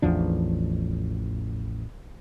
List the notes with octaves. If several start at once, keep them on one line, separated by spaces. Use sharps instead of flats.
A1 E2 F3 D4